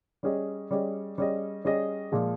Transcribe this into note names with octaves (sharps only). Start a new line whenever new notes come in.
G3 C#4 G#4 D#5
G3 C#4 G#4 D#5
G3 C#4 G#4 D#5
G3 C#4 G#4 D#5
A#2 F3 G#3